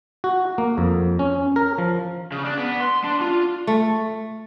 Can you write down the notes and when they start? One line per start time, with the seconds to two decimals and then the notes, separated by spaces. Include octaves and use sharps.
0.24 F#4
0.58 A#3
0.78 F2
1.19 C#4
1.56 A#4
1.78 F3
2.32 C#3
2.45 D4
2.58 B3
2.81 C6
3.05 D4
3.22 F4
3.67 A3